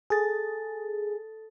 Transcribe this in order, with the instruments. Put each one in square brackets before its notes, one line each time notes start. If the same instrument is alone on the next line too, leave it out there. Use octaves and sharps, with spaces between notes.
[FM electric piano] G#4 [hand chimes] A4 A6